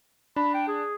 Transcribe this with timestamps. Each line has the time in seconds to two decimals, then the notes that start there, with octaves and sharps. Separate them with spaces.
0.36 D4 B5
0.54 G5
0.67 G#4